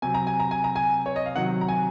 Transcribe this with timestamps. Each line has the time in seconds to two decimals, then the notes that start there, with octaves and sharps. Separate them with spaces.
0.02 C3 F#3 G#5
0.14 A#5
0.27 G#5
0.40 A#5
0.51 G#5
0.64 A#5
0.76 G#5
1.06 C#5
1.16 D#5
1.26 F5
1.36 C3 D#3 F#3 F#5
1.61 A#5
1.68 G#5